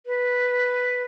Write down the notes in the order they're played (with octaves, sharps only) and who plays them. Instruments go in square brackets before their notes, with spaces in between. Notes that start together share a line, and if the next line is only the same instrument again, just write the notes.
[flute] B4